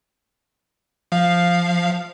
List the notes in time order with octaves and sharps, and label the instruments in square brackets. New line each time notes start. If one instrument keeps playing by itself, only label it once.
[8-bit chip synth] F3 F5